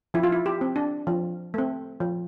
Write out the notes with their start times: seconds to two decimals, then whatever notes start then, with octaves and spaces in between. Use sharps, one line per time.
0.14 F3 E4
0.24 F4
0.32 E4
0.46 G4
0.61 C4
0.76 D4
1.07 F3
1.54 A3 C4
2.00 F3